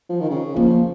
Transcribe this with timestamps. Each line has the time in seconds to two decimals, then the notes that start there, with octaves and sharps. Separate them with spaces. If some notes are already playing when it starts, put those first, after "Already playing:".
0.10 F3
0.20 D#3
0.30 C#3
0.56 F3 A#3